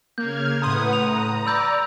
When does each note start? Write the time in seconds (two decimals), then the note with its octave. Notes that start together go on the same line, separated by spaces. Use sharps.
0.18 C#3 A#3 F6 G6 G#6
0.62 A2 B4 F#5 A#5 C6 D#6
0.93 A#5 F7
1.46 D5 B5 E6 G6